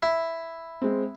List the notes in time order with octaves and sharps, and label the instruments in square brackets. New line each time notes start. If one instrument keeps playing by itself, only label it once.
[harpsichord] E4
[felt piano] G#3 C4